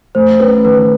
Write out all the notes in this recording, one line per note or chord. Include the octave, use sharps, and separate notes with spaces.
A3 C5
C#4 B4
D#3 B4